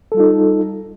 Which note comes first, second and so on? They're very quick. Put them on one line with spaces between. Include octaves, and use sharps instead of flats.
A4 G3 F4 D#4